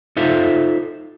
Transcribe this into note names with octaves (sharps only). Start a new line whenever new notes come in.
D#4 F4 A4 C5 E5 F5